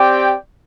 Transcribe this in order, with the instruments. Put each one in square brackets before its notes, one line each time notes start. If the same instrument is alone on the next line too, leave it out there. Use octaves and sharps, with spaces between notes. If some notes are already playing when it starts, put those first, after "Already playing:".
Already playing: [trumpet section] C4 G4 D5 G5